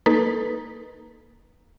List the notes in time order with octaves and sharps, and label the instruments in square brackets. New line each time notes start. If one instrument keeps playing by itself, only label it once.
[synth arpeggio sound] A#3 D#4 A4 B4